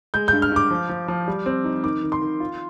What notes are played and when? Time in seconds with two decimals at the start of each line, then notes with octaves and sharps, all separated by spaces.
0.14 G#3 G6
0.28 G2 G6
0.42 F6
0.52 G2 D6
0.71 F3
0.89 F3
1.08 F3
1.28 G3
1.46 C4
1.64 D#4
1.84 D#3 D6
2.03 D#3
2.12 C6
2.21 D#3
2.40 F4